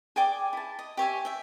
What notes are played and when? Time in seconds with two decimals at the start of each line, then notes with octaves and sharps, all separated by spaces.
0.16 G#4 D5 G5 D6
0.53 E4 A5
0.79 D#5
0.97 G4 C#5 E5 G#5
1.25 E5 G5